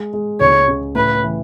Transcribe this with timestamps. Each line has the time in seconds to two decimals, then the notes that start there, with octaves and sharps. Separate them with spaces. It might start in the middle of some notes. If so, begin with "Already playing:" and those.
Already playing: G#3
0.13 G#3
0.40 C#2 C#5
0.68 C#3
0.95 A2 B4
1.24 E3